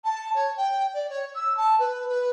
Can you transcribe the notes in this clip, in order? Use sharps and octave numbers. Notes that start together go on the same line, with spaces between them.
A5
C#5
G5
D5
C#5
E6
A5
B4
B4